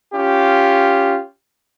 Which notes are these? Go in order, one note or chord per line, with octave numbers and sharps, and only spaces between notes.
C#4 F4 G4